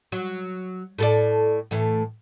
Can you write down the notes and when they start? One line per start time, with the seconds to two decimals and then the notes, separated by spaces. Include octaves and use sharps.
0.12 F#3
0.98 A2 A4 D5
1.71 A2 E3 A3